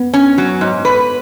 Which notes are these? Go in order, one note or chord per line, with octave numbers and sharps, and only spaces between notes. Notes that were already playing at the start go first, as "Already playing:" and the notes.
Already playing: B3
C#4
F#3
G#2
B4